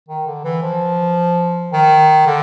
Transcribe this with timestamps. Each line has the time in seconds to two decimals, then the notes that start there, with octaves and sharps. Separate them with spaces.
0.08 D#3
0.26 D3
0.44 E3
0.62 F3
1.72 D#3
2.26 D3